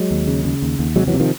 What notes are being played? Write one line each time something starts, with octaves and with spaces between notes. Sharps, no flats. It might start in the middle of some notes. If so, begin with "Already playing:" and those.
Already playing: F#3 G#3
D#2
C#3
C#3
D#2
D#2
C3 F#3 G#3
E3 F#3
C3
D#3 F3